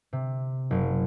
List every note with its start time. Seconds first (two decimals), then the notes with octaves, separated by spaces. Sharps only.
0.13 C3
0.71 F#1